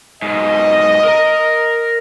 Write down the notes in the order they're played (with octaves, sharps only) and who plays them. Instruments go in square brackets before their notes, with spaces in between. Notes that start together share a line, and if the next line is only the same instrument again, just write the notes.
[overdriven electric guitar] G#2 B2 [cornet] D#5
[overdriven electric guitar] A#4 A#5